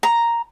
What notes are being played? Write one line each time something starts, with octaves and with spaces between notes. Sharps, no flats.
A#5